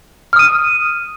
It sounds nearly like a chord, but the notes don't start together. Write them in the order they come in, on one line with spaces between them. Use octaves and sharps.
F6 D#6 D#7